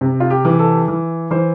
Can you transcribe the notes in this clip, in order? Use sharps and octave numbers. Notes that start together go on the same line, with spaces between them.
C3
F4
G4
E3
A4
E3
E3 C5